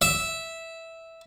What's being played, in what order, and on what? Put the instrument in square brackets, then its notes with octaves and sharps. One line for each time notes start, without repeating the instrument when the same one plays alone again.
[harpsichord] E5